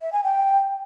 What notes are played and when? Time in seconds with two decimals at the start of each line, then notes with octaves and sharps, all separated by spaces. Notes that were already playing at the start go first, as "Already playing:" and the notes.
0.01 E5
0.13 G#5
0.24 G5